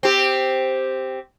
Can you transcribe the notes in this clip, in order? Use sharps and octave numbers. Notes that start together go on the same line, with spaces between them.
C4 G4